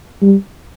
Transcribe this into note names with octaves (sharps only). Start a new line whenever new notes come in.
G3